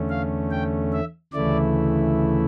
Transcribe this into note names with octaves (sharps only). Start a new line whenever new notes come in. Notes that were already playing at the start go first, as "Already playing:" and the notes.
Already playing: E2 D3 A3 C#4
F5
G5
E5
D2 C#3 E3 A3 E4 D5